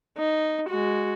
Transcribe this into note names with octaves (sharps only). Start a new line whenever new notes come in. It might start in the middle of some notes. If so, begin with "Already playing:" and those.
D#4
G#3 F#4